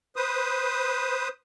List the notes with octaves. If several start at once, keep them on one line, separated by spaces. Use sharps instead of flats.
B4 C5 D#6